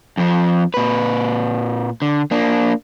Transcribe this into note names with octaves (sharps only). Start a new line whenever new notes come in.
F2 F3
A#2 B4
D3
A#3 D4